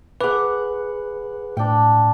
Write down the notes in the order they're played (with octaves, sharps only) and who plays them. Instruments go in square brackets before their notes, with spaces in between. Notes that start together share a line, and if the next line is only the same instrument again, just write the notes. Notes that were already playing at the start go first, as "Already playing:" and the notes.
[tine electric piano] G#4 B4 [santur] F#5 D6
[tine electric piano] A2 [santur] D4 G5